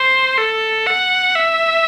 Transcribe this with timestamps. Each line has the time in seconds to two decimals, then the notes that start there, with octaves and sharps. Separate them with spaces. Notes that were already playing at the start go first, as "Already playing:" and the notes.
Already playing: C5
0.38 A4
0.86 F#5
1.35 E5